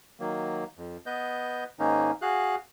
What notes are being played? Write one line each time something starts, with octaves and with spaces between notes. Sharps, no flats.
D#3 F#3 A#3
F2
B3 B4 D#5 G6
G#2 D#3 A#3 C#4 D#4
F#4 G#4 F5 F#6